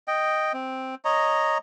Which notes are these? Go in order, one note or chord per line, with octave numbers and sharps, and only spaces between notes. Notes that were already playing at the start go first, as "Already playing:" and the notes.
D#5 G5
C4
C#5 D#5 A#5